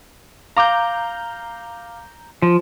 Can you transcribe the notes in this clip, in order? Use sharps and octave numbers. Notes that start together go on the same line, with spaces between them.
F5 A#5 D6 G6
F3